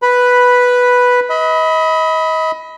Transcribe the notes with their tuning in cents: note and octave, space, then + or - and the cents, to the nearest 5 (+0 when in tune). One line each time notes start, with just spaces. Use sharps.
B4 +0 B5 -5
D#5 +35 B5 +0